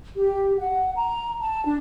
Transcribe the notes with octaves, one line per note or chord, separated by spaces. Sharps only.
G4
F#5
A#5
A5
D4